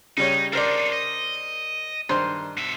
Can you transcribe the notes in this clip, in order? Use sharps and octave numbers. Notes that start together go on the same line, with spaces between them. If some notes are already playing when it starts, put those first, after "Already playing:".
C#3 G3 D#4 C#5
D4 D#4 A#4 C5 D5
D#5
G2 D#3 C5 C6
B2 E5